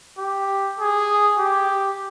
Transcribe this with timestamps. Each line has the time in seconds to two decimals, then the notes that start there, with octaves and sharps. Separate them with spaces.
0.19 G4
0.79 G#4
1.37 G4